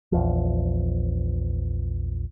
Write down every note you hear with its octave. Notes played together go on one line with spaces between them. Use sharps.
A#1 E2 F3